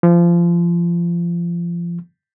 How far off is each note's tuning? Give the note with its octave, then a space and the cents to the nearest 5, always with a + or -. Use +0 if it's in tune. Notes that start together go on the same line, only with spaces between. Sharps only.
F3 -25